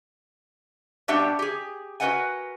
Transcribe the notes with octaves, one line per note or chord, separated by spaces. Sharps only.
B2 G3 D4 G4 E5 F#5
G4 G#4
F#4 A#4 B4 D#5 F#5 G#5